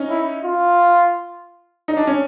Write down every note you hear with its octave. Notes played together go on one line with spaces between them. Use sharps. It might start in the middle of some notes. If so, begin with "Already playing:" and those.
Already playing: C#4 D#4
E4
F4
D#4
D4
C#4